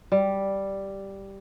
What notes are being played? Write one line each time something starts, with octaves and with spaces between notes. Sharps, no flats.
G3